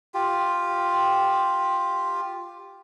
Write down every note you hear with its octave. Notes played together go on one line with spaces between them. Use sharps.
F4 G4